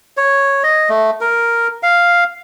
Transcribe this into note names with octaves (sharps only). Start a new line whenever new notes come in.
C#5
D#5
A3
A#4
F5